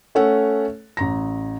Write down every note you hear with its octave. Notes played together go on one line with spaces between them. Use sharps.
A3 C#4 A4 C#5 F#5
A1 A#5 A#6